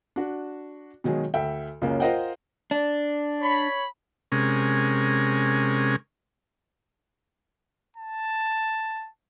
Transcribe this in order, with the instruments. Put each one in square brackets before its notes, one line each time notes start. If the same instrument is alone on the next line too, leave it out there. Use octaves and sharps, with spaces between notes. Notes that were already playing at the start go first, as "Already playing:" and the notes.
[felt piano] D4 F#4
B2 D#3 F#3 G#3
D2 E5 G5
C#2 F#2 C#3 A#3
F4 A#4 C5 D#5 F#5 G5
[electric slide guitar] D4
[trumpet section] C#5 B5
[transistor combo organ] C3 G#3 C#4 A#4
[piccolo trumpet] A5